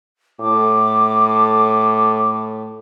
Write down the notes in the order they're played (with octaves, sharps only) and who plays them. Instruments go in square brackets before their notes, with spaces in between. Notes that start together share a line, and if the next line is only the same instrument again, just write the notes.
[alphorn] A2 [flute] D6